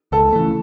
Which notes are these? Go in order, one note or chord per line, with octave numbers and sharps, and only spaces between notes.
C#2 A4
C#3 E3 A3